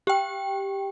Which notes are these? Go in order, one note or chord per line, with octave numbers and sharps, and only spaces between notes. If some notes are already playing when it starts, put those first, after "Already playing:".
G4 G5